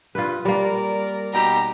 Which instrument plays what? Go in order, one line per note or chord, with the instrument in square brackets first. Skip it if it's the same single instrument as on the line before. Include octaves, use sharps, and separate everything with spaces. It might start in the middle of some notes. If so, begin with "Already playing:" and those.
[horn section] G2 [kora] F4 B4
[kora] G3 A#3 [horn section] A#4 D5
[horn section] B2 D#4 G4 [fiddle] A#5